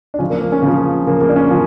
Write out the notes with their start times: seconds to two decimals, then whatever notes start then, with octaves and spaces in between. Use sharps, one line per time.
0.14 D4
0.19 C#3 F3 C#4
0.30 A#3
0.41 A#3
0.52 C#4
0.62 C#3 F3
1.07 C#3 F3 A#3
1.21 A#3
1.29 D4
1.36 C#4
1.51 C#3 F3